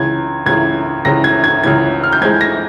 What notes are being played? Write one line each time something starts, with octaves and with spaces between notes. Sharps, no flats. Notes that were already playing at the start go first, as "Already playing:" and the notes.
Already playing: C#2 C#3 E3 G#6
C#2 C#3 E3 G#6
C#2 C#3 E3 A#6
G#6
G#6
C#2 C#3 E3 G#6
F6
G6
F2 E3 G#3 G#6
A#6